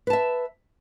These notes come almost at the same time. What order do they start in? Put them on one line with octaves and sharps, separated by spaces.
B4 A5 E5